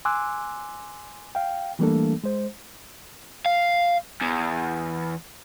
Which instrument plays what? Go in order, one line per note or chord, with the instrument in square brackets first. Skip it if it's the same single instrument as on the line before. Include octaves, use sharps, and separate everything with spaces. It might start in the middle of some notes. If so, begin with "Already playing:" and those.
[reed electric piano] G#5 C6 D6 E6 F#6
F5 G5
E3 G3 A3 A#3 D4 A4
G#3 C5
[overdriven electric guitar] F5
E2